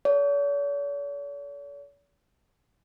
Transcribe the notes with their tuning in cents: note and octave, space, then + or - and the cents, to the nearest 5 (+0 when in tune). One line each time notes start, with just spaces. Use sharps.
A4 +0 C#5 +45